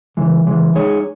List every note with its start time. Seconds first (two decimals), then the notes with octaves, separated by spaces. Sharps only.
0.17 C#3 E3 G#3
0.46 C#3 E3 G#3
0.75 G#3 D#4 G#4 C#5